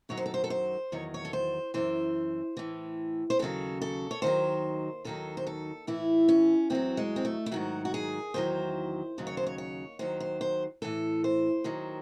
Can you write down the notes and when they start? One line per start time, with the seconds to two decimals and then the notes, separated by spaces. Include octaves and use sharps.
0.09 F#2 D#3 F#3 C#5
0.17 C5
0.26 A4
0.34 C5
0.44 A4
0.50 C5
0.92 E2 D#3 F#3 C#5
1.14 C#5
1.25 A4
1.33 C5
1.74 F#2 C#3 E3 C5
2.57 A2 E3
3.30 C5
3.39 D#2 C#3 F#3 A4
3.82 A4
4.11 C#5
4.22 D#2 D#3 F#3 C5
5.05 D#2 D#3 F#3 A4
5.37 C5
5.47 A4
5.87 A2 E3 E4
6.28 C#4
6.70 E2 D#3 C4
6.75 F#3
6.97 G#3
7.16 C4
7.25 A3
7.46 E4
7.51 G#2 D#3 F#3 F#4
7.85 F#4
7.94 G#4
8.34 E2 D#3 F#3 C5
9.18 D#2 C#3 F#3
9.27 C#5
9.37 C5
9.47 C#5
9.58 C#5
9.99 D#2 D#3 F#3 C5
10.20 C5
10.41 C5
10.82 A2 E3 A4
11.24 C5
11.64 D#2 D#3 F#3